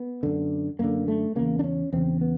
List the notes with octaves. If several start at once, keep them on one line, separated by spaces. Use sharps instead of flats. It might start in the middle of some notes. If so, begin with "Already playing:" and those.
Already playing: B3
F#2 D3
F#2 D3 A#3
A3
E2 C#3 A#3
D4
C#4
E2 C#3 C4
B3